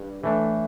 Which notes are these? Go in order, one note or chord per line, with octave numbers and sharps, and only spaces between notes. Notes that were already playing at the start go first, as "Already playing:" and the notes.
Already playing: G2
A2 E3 A3 D4